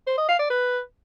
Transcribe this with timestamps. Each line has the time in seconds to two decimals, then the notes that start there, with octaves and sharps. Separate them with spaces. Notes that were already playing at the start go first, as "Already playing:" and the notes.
0.07 C5
0.18 D#5
0.28 F5
0.39 D5
0.50 B4